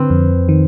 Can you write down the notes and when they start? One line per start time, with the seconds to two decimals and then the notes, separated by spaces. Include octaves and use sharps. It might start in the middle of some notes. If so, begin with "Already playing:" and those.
Already playing: D3 C4 B4 C5
0.10 F2
0.49 D#3